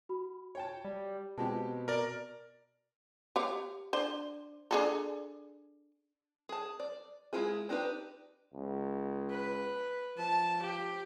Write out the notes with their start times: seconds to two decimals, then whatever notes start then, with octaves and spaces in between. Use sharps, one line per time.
0.09 F#4 B5
0.55 C#5 G5 A5
0.85 G3
1.38 B2 G#3 C4 G4 A5
1.88 A#4 D5
3.36 G4 C#5 F5
3.93 D4 C5
4.71 D4 G#4 A4
6.49 G#4 A5
6.80 D5
7.33 G#3 B3 E4 F4 G#4
7.69 C4 D4 D#4 G4 B4
8.54 C#2
9.30 B4
10.18 F3 A5
10.62 G4